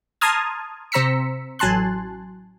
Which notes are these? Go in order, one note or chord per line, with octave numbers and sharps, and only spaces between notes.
A5 A#5 C6 D#6 F6 G#6
C3 C5 A#5 E6 B6 C#7
A1 F#3 G#5 A5 C6 F#6